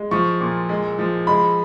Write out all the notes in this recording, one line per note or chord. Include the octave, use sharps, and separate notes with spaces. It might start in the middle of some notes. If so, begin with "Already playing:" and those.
Already playing: G#3
F3 C#6
A#2
G#3
F3
G#3 B5